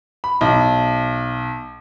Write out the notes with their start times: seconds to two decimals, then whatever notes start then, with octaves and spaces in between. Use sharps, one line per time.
0.24 B5
0.41 B1